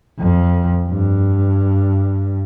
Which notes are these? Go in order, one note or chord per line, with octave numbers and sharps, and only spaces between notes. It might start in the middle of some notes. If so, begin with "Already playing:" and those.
F2
G2